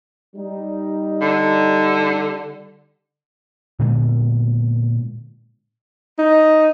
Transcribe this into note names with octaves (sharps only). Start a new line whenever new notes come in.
G3 D#4
D3
A#2 D3 G#3 B3
D#4